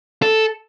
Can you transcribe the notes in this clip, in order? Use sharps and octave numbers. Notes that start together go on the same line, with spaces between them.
A4